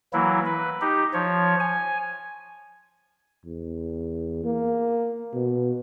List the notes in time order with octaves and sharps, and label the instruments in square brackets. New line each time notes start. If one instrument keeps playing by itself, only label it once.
[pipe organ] E3 F#3 A#3 E4
B4
D#4 G4
F3 C#5
G#5
[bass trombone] E2
A#3
B2